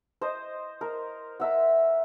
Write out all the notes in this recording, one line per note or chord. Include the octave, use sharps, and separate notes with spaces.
C5 D#5
A#4
A#4 E5 F#5